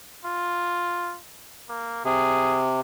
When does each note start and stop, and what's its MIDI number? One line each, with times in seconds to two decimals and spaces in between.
0.25 1.17 65
1.69 2.01 58
2.05 2.81 48
2.05 2.64 68